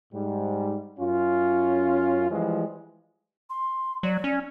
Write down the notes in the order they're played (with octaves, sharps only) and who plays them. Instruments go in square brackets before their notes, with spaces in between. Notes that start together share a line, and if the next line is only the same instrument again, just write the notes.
[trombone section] G#2 G3
F#2 C#4 F4
E3 F3 G3 G#3
[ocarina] C6
[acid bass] F#3 [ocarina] D5
[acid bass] C#4